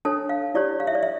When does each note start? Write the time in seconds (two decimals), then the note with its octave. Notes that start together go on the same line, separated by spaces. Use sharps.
0.05 D4 A4 C#5 A5
0.29 F5
0.54 E4 G4 C#5 D5
0.80 F5
0.87 E5
0.95 D5
1.03 E5